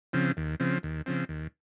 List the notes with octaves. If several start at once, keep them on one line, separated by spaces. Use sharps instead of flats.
C#3 F3 C4
D#2
C#3 F3 C4
D#2
C#3 F3 C4
D#2